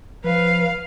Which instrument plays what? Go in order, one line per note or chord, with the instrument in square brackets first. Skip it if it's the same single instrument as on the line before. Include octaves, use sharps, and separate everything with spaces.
[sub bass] F3 [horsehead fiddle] B4 [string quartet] F5